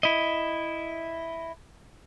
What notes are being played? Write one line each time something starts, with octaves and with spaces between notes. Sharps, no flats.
E4 D#5